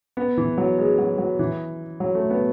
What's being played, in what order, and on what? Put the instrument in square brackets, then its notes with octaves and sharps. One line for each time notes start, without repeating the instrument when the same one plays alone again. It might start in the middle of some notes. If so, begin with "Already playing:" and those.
[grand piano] B3
E3
F#3
G#3
F#3
F#3
E3
F#3
A3
B3